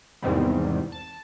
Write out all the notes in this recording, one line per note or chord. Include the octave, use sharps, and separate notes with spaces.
E2 G#2 C3 D#3 G3
A5